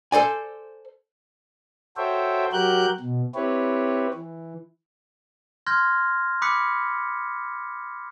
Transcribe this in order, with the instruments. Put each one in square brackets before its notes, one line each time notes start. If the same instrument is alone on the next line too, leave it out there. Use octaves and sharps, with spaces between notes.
[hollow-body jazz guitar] A4 C5 D5 G#5
[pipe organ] F#4 A4 C5 C#5 E5 G5
F#3 F#4 G4 A#4 F#6 G6
B2
C4 E4 G4 B4 C#5
E3
[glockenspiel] C6 F6 G6 G#6 A#6
B5 D6 D#6 F#6 B6 C#7